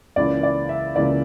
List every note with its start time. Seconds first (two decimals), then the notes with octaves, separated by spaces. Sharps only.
0.16 C#2 C#3 E3 A#3 D5
0.43 D5
0.69 E5
0.96 C#2 C#3 E3 A#3 D5